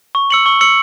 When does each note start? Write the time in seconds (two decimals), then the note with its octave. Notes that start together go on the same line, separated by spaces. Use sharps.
0.15 C#6
0.30 E6 C#7 F#7
0.46 C#6
0.61 E6 C#7 F#7